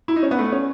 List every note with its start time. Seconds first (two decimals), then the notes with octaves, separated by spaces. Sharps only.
0.08 E4
0.16 D#4
0.23 C#4
0.31 B3
0.39 A3
0.52 C#4